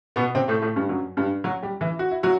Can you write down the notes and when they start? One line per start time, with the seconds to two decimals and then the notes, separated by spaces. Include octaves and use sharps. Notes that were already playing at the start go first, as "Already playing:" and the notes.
0.16 B2 B3
0.35 C3 C4
0.48 A2 A3
0.62 A2 A3
0.76 G2 G3
0.89 F#2 F#3
1.17 G2 G3
1.44 F#3 F#4
1.62 G3 G4
1.81 E3 E4
1.99 F#4
2.11 E4
2.23 F#3 F#4